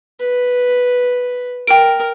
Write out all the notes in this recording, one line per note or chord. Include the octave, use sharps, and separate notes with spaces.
B4
A#4 G5 D7